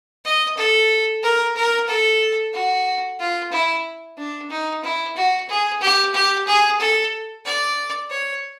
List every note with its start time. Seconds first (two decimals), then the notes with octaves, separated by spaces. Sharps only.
0.25 D#5
0.57 A4
1.23 A#4
1.56 A#4
1.88 A4
2.53 F#4
3.19 F4
3.52 E4
4.18 D4
4.50 D#4
4.83 E4
5.16 F#4
5.49 G#4
5.81 G4
6.14 G4
6.47 G#4
6.80 A4
7.45 D5
8.10 C#5